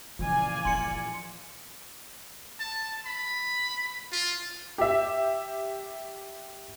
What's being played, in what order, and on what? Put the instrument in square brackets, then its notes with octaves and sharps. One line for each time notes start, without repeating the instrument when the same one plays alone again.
[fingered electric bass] A#2 E3 F3 [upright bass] C#3 [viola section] D5 F5 G#5
[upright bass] G1 A#3 [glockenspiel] C6 C#7
[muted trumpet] A5
B5
F4
[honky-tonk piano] G4 E5